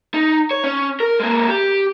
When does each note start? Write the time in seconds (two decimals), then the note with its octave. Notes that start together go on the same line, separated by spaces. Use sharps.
0.14 D#4
0.51 C#5
0.64 C#4
1.00 A#4
1.20 G#3 A#3
1.48 G4